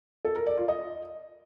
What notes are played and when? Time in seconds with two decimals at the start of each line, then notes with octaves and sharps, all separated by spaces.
0.25 A4
0.35 A#4
0.46 D5
0.57 F4
0.68 D#5